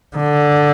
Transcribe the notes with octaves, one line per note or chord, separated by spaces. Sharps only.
D3